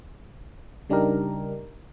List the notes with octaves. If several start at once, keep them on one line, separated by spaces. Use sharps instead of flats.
C#3 G3 D4 D#4 G4 A#4